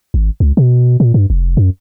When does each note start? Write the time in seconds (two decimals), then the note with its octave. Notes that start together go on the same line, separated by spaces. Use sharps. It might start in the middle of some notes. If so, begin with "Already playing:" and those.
0.14 G#1
0.40 C#2
0.57 B2
1.00 A#2
1.14 G2
1.30 F1
1.57 F#2